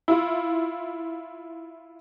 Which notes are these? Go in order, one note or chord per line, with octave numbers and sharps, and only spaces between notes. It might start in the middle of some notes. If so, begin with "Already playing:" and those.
E4 F4